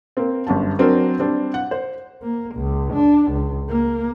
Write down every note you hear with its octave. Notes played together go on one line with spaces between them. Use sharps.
A#3 C4
G1 F#2 A5
F#3 C4 D4 F#4 A#4
G3 C4 D4
F#5
C5
A#3
C#2
D4
C#2
A#3